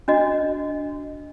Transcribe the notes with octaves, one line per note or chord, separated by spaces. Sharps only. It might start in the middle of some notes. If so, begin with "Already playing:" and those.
D4 F#4 D#5